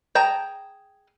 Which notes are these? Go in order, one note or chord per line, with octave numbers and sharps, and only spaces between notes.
G#4 G5 A5 A#5